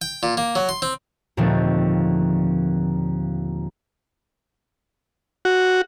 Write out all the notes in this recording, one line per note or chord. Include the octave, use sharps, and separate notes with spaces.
G5
A#2
A#3
F#3
C6
C4
D#2 A#2 D3 F3 A3 C4
F#4